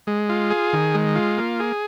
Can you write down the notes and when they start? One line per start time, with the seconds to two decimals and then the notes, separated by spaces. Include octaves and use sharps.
0.07 G#3
0.29 F4
0.51 G#4
0.73 D#3
0.95 G#3
1.15 F4
1.38 A#3
1.60 G#4